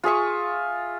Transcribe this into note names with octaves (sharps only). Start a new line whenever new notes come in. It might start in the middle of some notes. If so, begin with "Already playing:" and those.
F4 G#4 E5 C#6